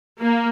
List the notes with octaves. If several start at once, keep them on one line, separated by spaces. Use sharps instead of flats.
A#3